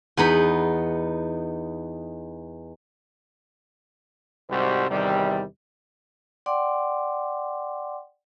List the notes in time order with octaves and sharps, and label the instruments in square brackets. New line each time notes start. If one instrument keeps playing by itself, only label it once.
[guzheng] E2 B3 D#4 B5
[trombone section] C2 G#2 C3 G3 F#4 C5
E2 C3 D#3 G3
[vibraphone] D5 F#5 G5 C6 D6